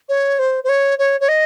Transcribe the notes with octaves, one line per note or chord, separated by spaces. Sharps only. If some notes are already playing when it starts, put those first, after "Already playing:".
C#5
C5
C5
C#5
C#5
C#5
D#5